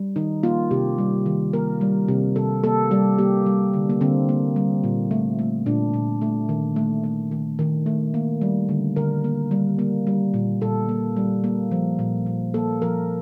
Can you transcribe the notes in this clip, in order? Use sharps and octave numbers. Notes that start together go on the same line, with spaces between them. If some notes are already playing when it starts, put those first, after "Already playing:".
Already playing: G3
D#3 D#4
A#3 F4
C3 G4
G3
D#3
A#3 A#4
G3
C3
C3 A4
A#3 A4
G3 G4
A#3 G4
G3
D3
A#3
D3 C4
A#3
G3
A#2
A3
A3
A#2 D4
A#2
A3
D#3
A3
A3
D#3
D#3
A3
A#3
G3
D3
D3 A#4
A#3
G3
A#3
G3
A#2
A#2 A4
A#3
G3
A#3
F3
A#2
A#2
A#3 A4
F3 A#4